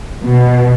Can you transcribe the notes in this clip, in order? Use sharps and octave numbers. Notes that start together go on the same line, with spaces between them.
B2